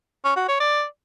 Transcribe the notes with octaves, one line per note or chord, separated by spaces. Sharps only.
C#4
F#4
C#5
D5